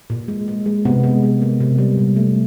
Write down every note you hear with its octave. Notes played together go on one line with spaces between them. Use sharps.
A#2
G#3
G#3
G#3
C3 B3
G#3
G#3
A#3
C3
G3
A#2
A3